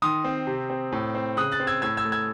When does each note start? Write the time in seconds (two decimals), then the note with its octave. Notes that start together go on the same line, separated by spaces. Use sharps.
0.02 D#3 C6 D#6
0.24 C4
0.47 C3
0.70 C4
0.92 A2
1.15 C4
1.37 C#3 D#6 F#6
1.52 F#6 A6
1.60 C4
1.67 E6 G#6
1.82 A2 E6 G#6
1.97 E6 G#6
2.05 A3
2.12 E6 G#6